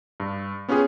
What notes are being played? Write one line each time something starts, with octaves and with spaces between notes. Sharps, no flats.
G2
B3 C#4 F4 G4 G#4